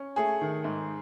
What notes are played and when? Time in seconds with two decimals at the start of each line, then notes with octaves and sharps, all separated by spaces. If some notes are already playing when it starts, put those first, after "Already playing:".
Already playing: C#4
0.16 A3 G#4
0.41 D#3
0.64 G#2